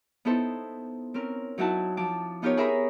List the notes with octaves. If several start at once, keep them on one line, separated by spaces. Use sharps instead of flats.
B3 D#4 E4 A4 C5
C4 C#4 A#4
F#3 D#4 E4 F#4 A5
F3 A5 D6
B3 D#4 F4 G4 A#4 C#5
G#4 A#4 E5 A#5 B5 D#6